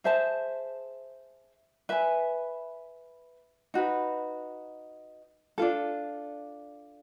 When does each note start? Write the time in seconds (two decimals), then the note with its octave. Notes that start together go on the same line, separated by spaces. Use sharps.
0.04 G#4 C5 E5 A5
1.89 B4 E5 G#5
3.74 D#4 F#4 B4
5.58 D4 F4 A4